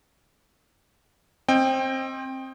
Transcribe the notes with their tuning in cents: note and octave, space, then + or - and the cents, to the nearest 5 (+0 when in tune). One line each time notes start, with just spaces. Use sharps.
C4 +20 D#5 +0 G5 +10